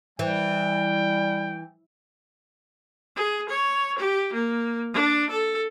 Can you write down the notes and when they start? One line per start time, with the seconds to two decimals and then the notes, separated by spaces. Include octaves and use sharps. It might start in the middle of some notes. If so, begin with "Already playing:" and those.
0.19 E3 G3 G5
3.16 G#4
3.49 C#5
3.98 G4
4.33 A#3
4.94 D4
5.30 A4